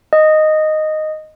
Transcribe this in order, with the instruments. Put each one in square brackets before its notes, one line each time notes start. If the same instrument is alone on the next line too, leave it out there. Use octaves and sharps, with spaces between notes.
[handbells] D#5